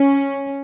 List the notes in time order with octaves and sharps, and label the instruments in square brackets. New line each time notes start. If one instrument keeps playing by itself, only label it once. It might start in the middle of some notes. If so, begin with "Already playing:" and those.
Already playing: [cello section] C#4